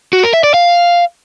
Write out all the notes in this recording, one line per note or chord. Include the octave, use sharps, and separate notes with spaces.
F#4
A#4
E5
D5
F5